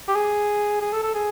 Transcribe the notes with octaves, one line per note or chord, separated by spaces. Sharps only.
G4
G#4
G#4
A4
A4
G#4